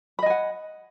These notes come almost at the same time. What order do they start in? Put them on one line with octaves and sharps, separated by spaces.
B5 D#5 G#5 F#5